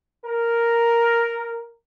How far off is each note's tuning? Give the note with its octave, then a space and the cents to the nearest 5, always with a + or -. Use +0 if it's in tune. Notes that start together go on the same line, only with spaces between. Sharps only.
A#4 +0